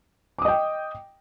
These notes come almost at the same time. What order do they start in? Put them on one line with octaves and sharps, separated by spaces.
D6 D#6 D#5 G5